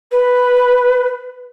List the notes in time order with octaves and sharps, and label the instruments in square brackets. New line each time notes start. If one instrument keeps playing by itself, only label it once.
[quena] B4